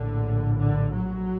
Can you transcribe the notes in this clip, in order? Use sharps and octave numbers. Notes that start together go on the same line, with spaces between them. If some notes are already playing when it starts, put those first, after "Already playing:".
Already playing: A#1 A2 D3
D3
F#3